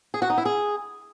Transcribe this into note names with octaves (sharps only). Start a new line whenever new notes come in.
G#4
F#4
D#4
E4
G#4